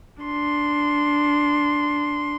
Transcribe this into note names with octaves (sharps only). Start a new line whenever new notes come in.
D4 C6